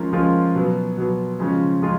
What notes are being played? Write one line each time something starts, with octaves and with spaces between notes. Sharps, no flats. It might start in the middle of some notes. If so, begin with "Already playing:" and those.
Already playing: F3 G#3 C#4 F4 A#4
F3 G#3 C#4 F4 A#4
B2 F#3 B3
B2 F#3 B3
C#3 F3 G#3 C#4 F4
C#3 F3 G#3 C#4 F4